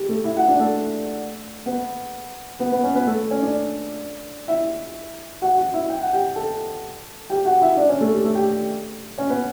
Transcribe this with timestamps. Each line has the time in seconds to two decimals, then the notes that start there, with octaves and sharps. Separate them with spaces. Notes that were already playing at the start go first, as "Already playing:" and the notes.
Already playing: G4
0.09 A3 A4
0.24 E4 E5
0.36 F#4 F#5
0.48 D4 D5
0.59 A3 A4
1.66 B3 B4
2.59 B3 B4
2.72 B3 B4
2.83 C#4 C#5
2.95 B3 B4
3.06 A3 A4
3.30 C#4 C#5
3.42 D4 D5
4.48 E4 E5
5.42 F#4 F#5
5.57 F#4 F#5
5.74 E4 E5
5.90 G5
6.01 F#5
6.13 G4 G5
6.36 A4 A5
7.30 G4 G5
7.45 F#4 F#5
7.61 E4 E5
7.77 D4 D5
7.89 C#4 C#5
8.01 A3 A4
8.13 G4
8.24 A3 A4
8.35 G4 G5
9.18 C#4 C#5
9.30 B3 B4